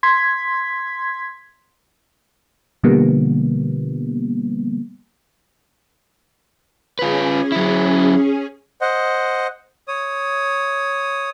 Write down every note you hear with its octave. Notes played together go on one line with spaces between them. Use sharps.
C6 G#6 B6
B2 D3 F3 G3 A#3 B3
C#4 F4 G#4 B4
F#3 E4
C5 D#5 F#5
C#5 D#6